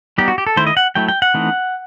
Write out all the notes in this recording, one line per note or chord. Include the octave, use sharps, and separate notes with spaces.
G3 B3 D#4 G4
F#4
G4
A4
D#3 A3 E4 C5
D#5
F#5
F#3 A3 E4 G5
G5
F#5
E3 A3 C4 D#4